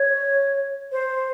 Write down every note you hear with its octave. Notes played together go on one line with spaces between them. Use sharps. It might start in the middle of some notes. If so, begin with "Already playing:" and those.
Already playing: C#5
C5